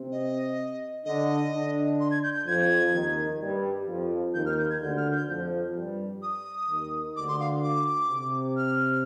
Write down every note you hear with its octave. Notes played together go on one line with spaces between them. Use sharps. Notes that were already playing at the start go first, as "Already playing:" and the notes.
Already playing: C3 C4
D#5
D3 D4 D#5
D3 D4
C6
G#6
G6
G6
F2 F3 G#6
D#2 D#3
G2 G3
F2 F3
D#2 D#3 G6
F6
G6
G#6
D2 D3 G6
F6
G6
F2 F3
G2 G3
D#6
D#2 D#3
D2 D3 D6
C6
F5
D6
C3
F6